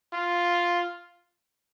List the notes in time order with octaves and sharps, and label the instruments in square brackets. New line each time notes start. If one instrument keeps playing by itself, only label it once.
[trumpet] F4